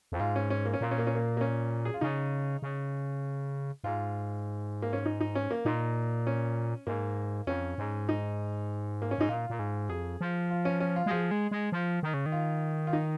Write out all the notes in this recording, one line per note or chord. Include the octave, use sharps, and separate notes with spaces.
F2
G#2 F4
C#4
C#4
A#3
C#4
A#2 A#3
C#4
A#3
C#4
A#3
A#3
C#4
G#4
F4
C#3 D#4
C#3
G#2 F4
A#3
C#4
D#4
D#4
C#4
A#3
A#2 D#4
C#4
G#2 A#3
F2 C#4
G#2
D#4
A#3
C#4
G#2 D#4
A#2 F4
A#2
G#2
F2 G#4
F3
F4
C#4
C#4
F4
G#3
F3 G#4
G#3
G#3
F3
D#3
C#3
D#3
F4
F4
D#4